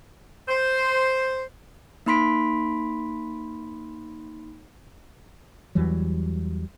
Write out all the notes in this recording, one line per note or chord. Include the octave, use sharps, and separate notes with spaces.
C5
A#3 D#4 B5 C6 B6 D7
E2 E3 F#3 G3